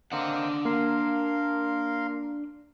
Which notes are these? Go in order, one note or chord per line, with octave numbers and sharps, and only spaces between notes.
A#3 C4 D4 D#5 F#5
A#3 A#4 F5 C6